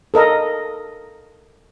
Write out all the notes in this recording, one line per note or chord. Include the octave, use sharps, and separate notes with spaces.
A4 A#4 D#5 A#5